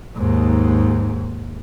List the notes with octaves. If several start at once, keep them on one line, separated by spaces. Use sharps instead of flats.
D#2 G#2